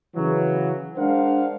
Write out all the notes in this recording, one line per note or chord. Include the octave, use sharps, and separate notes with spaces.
C#3 E3 F#3
G#3 D4 A#4 C5 F5 F#5